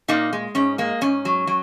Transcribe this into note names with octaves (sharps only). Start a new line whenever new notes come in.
A#2 A#3 D#4
G#3
G#2 C#4
G#3 A#3
G#2 C#4
F#3
F#3